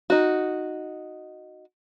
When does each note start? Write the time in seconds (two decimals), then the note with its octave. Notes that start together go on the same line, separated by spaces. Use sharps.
0.10 D#4 F#4